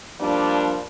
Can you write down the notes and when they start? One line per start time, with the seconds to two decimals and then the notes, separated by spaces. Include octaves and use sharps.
0.21 F3 G3 A#3 D4